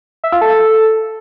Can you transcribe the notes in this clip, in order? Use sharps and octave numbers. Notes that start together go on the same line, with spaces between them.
E5
F4
A4